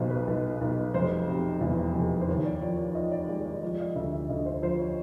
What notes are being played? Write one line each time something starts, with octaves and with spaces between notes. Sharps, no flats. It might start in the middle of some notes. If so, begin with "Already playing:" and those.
Already playing: B1 B2 C5
B4
B1
B1
F1 C5
C3
E2
F1
C5
D#2 C#5
D5
F3 C#5
D5
F3 D#5
D5
G#3 D5
D5
F3 D5
D#5
D2 E5
E5
D2 D#5
C5
F3 C5
C#5